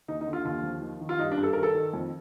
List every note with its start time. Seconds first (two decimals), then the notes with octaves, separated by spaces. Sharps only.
0.08 D#2 D#4
0.21 D#4
0.27 D3
0.33 F4
0.45 D#2 F4
0.63 F3
0.82 D#3
1.01 D#3
1.09 F4
1.19 G2 D#4
1.32 D4
1.38 G2
1.43 A4
1.53 D#3 A#4
1.63 A4
1.75 D#3
1.93 F2